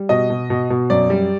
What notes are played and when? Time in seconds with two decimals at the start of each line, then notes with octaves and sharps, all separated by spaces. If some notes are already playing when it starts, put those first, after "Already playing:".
Already playing: G3
0.09 B2 D#5
0.30 B2
0.50 B2
0.70 B2
0.90 F#2 D5
1.10 G3